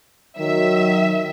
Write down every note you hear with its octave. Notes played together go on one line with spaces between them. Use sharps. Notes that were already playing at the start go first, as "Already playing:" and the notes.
D#3 F#3 E5